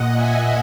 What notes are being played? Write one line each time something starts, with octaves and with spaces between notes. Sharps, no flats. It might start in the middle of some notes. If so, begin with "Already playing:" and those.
Already playing: A#2 D#5 F#5
E5 G#5